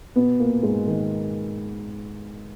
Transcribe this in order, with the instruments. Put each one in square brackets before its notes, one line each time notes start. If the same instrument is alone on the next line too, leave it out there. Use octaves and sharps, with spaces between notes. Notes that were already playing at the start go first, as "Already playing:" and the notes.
[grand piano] B2 B3
A#2 A#3
G#2 G#3
D#3